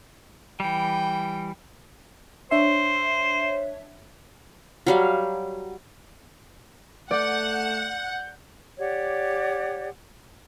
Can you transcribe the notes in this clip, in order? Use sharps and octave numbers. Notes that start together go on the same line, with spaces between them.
E3 G3 G5
D4 C5 C#5 E5
F#3 G3 F5
A3 D5 F#5 G6
G4 C#5 D5 F#5